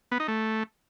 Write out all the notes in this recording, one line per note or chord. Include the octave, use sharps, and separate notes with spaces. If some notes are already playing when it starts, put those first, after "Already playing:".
B3
D#4
A3